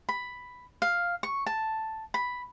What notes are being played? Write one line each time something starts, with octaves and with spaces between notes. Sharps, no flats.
B5
F5
C#6
A5
B5